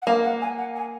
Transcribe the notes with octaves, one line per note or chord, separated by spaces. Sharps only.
F#5
A#3 F5
F#5
G#5
F#5
G#5